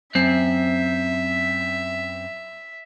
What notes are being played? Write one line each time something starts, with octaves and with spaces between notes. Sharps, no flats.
F#2 C4 E5